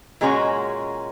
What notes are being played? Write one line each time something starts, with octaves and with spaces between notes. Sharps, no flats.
A#2 G#3 C#4 F#4